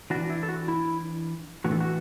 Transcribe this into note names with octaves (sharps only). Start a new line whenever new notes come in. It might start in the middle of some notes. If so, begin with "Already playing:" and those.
E3 D4 F#4
E4
A4
F#4
E4
A2 E3 A3 D4 F#4
A4
F#4